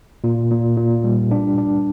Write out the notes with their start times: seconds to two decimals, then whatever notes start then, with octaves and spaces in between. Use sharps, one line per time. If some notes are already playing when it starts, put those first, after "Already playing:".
0.24 A#2
0.51 A#2
0.77 A#2
1.04 G3
1.31 D4
1.58 D4